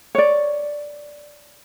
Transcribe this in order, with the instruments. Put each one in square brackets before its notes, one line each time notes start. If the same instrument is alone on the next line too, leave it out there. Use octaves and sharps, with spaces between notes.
[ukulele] C#5 D5